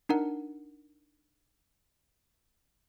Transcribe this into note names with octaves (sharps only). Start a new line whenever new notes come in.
D4 D#4 A#4 F#5